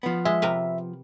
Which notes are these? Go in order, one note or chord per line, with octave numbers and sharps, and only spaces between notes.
F3 B3
G#3 E5
C3 A#4 B4